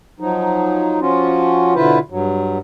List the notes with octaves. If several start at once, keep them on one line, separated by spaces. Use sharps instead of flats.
F3 F#3 D#4
F3 C#4 F4 F#4
B2 D3 E4 F4 B4 C5
G2 F#3